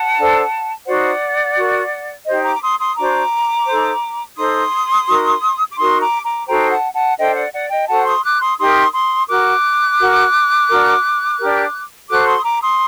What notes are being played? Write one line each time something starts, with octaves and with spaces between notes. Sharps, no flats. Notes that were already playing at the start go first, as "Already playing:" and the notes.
Already playing: F#5 A5
D4 A4 C5
D#4 F#4 C5 D5 F#5
F#4 A#4
D#4 G4 C5 D#5
A#5 D6
D6
C6 D#6
C6 D#6
D4 F#4 C5 A#5 D6
D#4 A4 C5
D#4 A4 C5 C6 D#6
D#4 F#4 A#4
D6
D#4 F#4 A#4 C6 D#6
A#5 D6
A#5 D6
D#4 F#4 A4 C5 G5 A#5
F#5 A5
F#5 A5
D4 A4 C5 D#5 G5
D5 F#5
D5 F#5
D#5 G5
F#4 A4 C5 F#5 A5
C6 D#6
D6 F#6
C6 D#6
D#4 G4 A#4 C6 D#6
C6 D#6
F#4 A#4 D6 F#6
F#4 A#4
D4 F#4 A#4
D4 G4 A#4
F#4 A4 C5 D6 F#6
C6 D#6
D#6
A#5 D6
C6 D#6